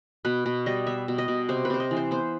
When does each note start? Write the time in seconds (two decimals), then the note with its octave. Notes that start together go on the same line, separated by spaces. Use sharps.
0.25 B2 B4
0.46 B2
0.66 G3 D#5
0.87 B3 E5
1.08 B2
1.18 D#5
1.28 B2
1.49 C3 C5
1.65 B4
1.70 C3 C5
1.80 D#5
1.91 E3
1.97 C5
2.11 B3 C5